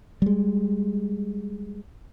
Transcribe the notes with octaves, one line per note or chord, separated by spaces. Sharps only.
G3 G#3